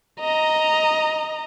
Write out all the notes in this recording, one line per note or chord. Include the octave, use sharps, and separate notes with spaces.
D#5 A#5